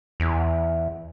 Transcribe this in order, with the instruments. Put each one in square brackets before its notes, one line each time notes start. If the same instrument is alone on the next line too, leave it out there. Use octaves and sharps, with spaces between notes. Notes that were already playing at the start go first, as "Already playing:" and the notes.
[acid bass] E2